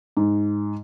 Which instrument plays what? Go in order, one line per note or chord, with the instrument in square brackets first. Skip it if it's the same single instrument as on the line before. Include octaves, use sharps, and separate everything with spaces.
[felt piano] G#2